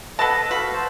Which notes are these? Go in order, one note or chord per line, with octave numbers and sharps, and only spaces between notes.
B3 A4 B4 D#5 A5
F#4 A4 B4 F5
C5 A5